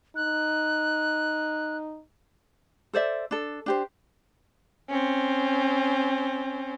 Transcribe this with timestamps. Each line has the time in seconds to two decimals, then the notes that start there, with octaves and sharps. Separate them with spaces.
0.16 D#4 F#6
2.93 A4 C5 D5 E5
3.31 D4 A4
3.66 D4 G4 C5
4.89 C4 C#4